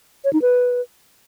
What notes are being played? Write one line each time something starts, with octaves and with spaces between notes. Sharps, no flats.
C#5
D#4
B4